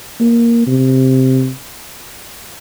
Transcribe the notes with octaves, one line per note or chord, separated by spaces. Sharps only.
A#3
C3